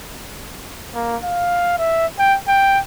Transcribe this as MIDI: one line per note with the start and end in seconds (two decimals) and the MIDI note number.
0.94 1.17 58
1.24 1.78 77
1.79 2.06 76
2.18 2.37 79
2.48 2.79 79